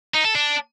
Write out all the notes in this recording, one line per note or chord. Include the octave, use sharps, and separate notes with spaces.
D#4
A4
D4